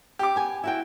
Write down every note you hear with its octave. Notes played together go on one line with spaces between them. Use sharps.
G4 D6
B3 G#5
E4 F#4 G5